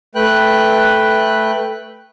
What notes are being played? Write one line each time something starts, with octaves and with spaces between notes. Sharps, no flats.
A3 B4 G5 F#6